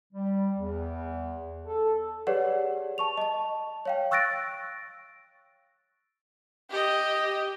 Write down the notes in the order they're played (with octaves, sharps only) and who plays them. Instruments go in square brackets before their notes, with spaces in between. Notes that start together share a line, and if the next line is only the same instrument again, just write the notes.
[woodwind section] G3
E2
A4
[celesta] G4 G#4 B4 C#5 D5 F#5
A5 C#6 F7
D#5 A5
C#5 F5 G5
C#6 E6 F#6 A6 A#6 D7
[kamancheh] G4 D#5